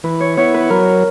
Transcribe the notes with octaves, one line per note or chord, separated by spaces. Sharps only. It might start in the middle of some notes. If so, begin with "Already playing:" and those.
E3 B4
C#5
B3 E4 C#5
B4
F#3 A#4